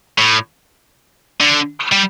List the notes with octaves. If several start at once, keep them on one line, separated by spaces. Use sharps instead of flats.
A2
D3
G3